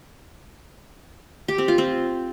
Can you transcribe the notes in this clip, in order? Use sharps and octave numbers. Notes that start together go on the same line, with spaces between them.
G4
C4
F4
C4